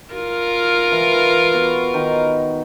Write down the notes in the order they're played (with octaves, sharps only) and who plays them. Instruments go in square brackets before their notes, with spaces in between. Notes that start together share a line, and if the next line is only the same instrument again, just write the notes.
[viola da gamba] F4 A#4
[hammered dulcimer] E3
B3 F#4
D#3